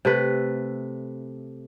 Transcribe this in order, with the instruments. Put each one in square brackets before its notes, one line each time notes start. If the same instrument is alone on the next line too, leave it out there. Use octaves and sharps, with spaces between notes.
[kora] C3 A3 B4